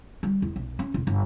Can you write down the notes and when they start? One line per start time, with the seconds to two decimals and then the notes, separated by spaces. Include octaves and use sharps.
0.23 G3
0.42 E2
0.56 B1
0.79 C#4
0.94 E1
1.07 G1